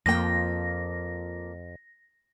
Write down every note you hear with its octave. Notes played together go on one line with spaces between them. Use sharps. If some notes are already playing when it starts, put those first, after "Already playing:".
F2 F3 A#3 G5 A#6